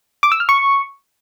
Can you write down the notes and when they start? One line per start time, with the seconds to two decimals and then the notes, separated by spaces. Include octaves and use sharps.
0.23 D6
0.32 E6
0.40 F6
0.49 C#6